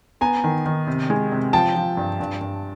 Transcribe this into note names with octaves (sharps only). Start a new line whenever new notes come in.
B3 G#5 A#5
D#3
D#3
C3
G#3
C3
F3 G5 A5
F3
G2
G2
G2